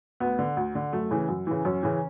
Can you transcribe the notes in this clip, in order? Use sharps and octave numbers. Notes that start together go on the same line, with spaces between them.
D2 B3
D3
D2
D3
F#2 A3
C#3 E3
F#2
C#3 E3
F#2 C#4
C#3 E3